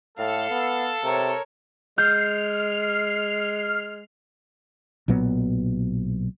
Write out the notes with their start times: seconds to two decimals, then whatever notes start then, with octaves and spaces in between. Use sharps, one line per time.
0.18 A2 A4 F5
0.51 B3
1.04 C3 A#4 C#5
1.98 G#3 F6 G6 C7
5.08 B1 A#2 F#3 B3